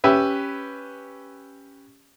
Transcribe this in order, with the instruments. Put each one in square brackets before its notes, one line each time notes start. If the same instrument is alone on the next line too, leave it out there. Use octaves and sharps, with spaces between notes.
[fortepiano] C#4 G4 B4 E5